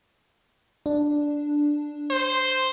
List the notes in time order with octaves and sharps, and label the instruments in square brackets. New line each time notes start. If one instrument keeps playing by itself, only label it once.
[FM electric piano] D4
[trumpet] C5